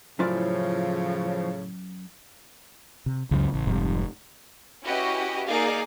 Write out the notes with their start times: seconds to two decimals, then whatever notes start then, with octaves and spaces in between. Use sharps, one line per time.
0.19 F#2 A2 C#3 F3 E4 F4 D5
3.06 C3
3.31 C#2 F#2 C#3
3.54 A1
3.67 F1 G#2 F3 G3
4.85 C#4 E4 F#4 G4 B4 D#5
5.46 A#3 D#4 G#4 D5 F5